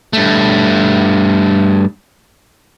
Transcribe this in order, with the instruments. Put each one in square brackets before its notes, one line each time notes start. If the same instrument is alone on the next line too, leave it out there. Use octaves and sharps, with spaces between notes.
[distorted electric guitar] G2 A3